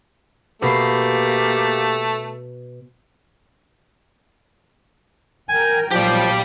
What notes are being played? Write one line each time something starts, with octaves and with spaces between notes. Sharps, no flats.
B2 A3 A#3 G4 C7
A#4 G5 G#5
B1 A#2 F3 G4 D5 F5